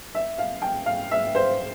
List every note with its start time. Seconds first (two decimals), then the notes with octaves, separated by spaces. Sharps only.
0.15 E5
0.38 F5
0.62 G5
0.86 F5
1.11 E5
1.35 C5